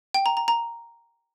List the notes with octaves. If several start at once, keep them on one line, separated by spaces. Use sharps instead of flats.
G5
A#5
A#5
A#5